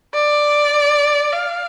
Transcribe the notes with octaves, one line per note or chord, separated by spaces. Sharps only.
D5
F5